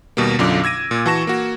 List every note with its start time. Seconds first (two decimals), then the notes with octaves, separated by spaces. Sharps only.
0.17 D#2 B2 G3 A#3
0.39 B1 F#2 D3 D4 F4 D6
0.64 E6 G#6 A#6 D#7
0.91 A#2
1.06 E3 F#4 A5 C#6 A#6 E7
1.27 A#3 F#4